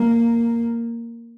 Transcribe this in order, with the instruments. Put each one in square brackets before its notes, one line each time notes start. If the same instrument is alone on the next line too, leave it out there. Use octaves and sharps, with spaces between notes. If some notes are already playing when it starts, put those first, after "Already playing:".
Already playing: [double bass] A#3